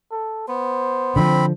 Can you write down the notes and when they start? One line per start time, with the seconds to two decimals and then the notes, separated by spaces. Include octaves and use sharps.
0.12 A4
0.48 B3 C5
1.16 D3 E3 F3 C4 B5